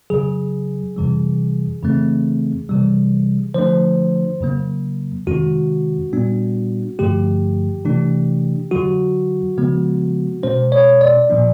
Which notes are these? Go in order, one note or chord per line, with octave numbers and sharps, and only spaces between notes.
F2 C#3 F#3 G#4
F2 C3 E3 G3
F2 C#3 E3 A3 C4
C3 E3 G3
D3 F3 A3 D4 C5
F2 C#3 F#3 A#3
F2 C3 D#3 G#3 C#4 F#4
A#2 G3 B3 D4
G2 D3 F3 A3 G4
C3 E3 A3 D4
F2 D3 F#3 F#4
C#3 F3 G#3 B3
B2 G#3 C#4 C5
C#5
D5
A#2 F3 A#3 D4